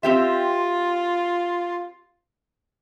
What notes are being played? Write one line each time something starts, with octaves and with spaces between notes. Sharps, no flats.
C4 F4 G4 E5